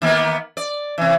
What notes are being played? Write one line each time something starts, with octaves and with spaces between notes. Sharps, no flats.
D#3 A#3 B3
D5
C3 E3